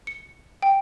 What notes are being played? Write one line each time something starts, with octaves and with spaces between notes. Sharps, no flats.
C#7
G5